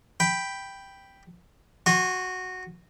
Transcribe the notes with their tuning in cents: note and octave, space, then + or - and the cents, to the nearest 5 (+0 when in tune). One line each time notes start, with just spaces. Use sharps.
G5 +0 B5 +0
F#4 -5 G#5 -20 C6 +40